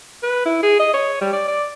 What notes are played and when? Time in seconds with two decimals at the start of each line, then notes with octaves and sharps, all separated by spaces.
0.23 B4
0.45 E4
0.63 G#4
0.79 D#5
0.94 C#5
1.21 G3
1.33 D5
1.48 D5